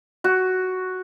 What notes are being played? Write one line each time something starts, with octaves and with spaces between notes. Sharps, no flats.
F#4